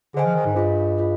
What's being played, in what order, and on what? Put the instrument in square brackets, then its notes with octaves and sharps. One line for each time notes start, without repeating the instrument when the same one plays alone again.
[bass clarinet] D3 [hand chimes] G#4 C5 D#5 G#5
[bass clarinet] F3
D#3
G#2
[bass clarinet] G2 [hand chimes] F4 G#4 D#5
[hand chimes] F4 G#4 D#5